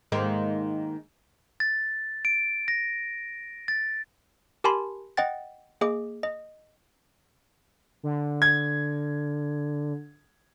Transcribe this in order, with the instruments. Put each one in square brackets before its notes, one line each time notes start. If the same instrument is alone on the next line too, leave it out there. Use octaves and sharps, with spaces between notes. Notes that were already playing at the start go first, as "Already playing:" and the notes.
[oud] G#2 D#3 A#3
[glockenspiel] A6
D7
A#6
A6
[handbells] G4 A#4 G#5 A5 B5 C6
D#5 F#5 G5 A6
A#3 G#4 D#5 D6
D#5
[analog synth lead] D3
[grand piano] G#6